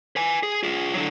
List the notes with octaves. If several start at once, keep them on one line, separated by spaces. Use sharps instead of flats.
B4 G#5
G#4
F4 G#4
D3 F#3